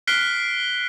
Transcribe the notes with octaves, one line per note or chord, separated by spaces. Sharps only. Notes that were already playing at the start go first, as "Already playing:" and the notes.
F6 F#6 B6 C7 D7 G7